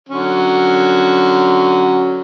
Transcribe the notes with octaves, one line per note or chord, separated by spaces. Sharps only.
D3 F#3 C#4